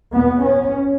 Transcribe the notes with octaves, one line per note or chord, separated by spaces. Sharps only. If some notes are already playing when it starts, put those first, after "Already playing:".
E2 B2 B3
C#4